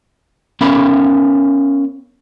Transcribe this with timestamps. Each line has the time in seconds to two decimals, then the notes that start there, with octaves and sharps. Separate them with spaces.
0.61 B3 C#4 A#4 E5 F5 B5